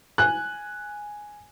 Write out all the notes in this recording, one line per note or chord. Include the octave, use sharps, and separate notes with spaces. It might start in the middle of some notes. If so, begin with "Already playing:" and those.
G#5 F#6